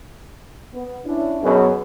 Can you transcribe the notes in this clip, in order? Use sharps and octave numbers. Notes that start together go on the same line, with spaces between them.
B3
C#4 D4 E4
F#2 B2 G#4